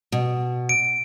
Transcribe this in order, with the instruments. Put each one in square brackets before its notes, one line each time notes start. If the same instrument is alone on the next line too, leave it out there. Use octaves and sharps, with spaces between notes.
[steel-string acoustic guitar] B2
[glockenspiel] D7